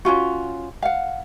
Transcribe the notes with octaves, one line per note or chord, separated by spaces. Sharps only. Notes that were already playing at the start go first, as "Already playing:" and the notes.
C#4 D4 F4 F#4
F5 F#5